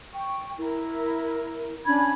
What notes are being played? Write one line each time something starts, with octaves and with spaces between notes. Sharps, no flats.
G5 C#6
E4 A#4
C#4 D4 B5 G#6